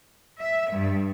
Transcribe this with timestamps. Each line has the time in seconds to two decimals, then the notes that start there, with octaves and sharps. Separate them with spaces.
0.38 E5
0.70 G2